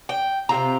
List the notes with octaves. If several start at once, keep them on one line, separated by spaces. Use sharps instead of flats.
G5
C3 G3 C4 F4 A#5